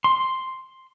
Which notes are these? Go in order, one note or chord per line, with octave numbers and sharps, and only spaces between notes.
C6